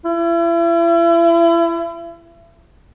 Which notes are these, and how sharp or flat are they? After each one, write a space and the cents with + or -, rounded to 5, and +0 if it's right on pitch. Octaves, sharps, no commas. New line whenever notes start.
E4 +35